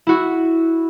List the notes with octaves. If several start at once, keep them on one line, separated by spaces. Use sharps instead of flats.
E4 F#4